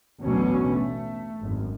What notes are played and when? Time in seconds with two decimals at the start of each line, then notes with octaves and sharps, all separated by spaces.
0.21 A1 D2 B2 F#3 C#4
0.70 A3
1.40 G#1 F#2